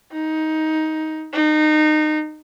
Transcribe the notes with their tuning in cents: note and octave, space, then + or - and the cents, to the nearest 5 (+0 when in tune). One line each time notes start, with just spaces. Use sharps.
D#4 +15
D#4 -25